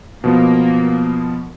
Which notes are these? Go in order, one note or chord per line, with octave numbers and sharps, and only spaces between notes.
B2 F3 A#3 B3